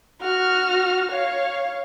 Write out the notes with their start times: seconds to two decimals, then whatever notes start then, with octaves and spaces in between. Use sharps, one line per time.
0.21 F#4 F6
1.11 C#5 F5